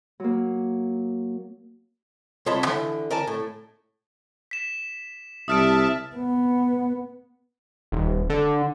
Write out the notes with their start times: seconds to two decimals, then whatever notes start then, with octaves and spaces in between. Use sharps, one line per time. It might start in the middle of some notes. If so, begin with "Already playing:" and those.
0.20 F#3 A#3
2.46 C2 F4 C#5 D#5 A5 B5
2.63 D3 E3
3.11 A#4 D5 G#5 A5
3.27 A2
4.51 B6 E7
5.48 C2 E5 A5 D#6 F6 D7
6.16 B3
7.92 D#1
8.30 D3